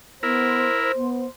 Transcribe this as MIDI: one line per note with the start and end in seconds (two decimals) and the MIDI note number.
0.23 0.69 59
0.23 0.92 64
0.23 0.92 70
0.23 1.31 72
0.96 1.26 59